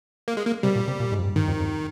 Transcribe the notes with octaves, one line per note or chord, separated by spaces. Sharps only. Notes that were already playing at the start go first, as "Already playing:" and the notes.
A#3
G#3
A#3
C3 G3
A#2
C3
A#2
G#2
F2
G2
G#2 D#3
F2
F2